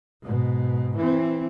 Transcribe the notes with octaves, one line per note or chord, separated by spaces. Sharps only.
G#2 B2
E3 C4